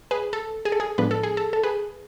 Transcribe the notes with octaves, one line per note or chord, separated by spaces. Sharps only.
G#4 B4
A4
G#4
A4
G#4
A2 F3 G#3 B3 D4 B4
A4
G#4
A4
A4
G#4 B4